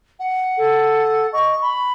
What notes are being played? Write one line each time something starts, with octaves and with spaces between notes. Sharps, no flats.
F#5
A4
D#5 C#6
B5